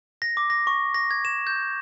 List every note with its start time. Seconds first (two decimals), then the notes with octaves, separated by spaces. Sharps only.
0.22 A#6
0.37 D6
0.50 A#6
0.67 C#6
0.94 A#6
1.11 G#6
1.25 E7
1.47 G6